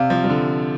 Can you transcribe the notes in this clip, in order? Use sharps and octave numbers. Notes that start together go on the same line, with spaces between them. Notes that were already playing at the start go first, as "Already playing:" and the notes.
Already playing: C3 D5 F5
F3
F3
D3